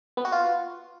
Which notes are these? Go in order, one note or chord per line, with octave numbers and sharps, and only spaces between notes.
B3
F#4
F4